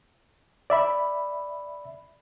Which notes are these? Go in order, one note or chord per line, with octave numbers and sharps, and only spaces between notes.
D5 E5 B5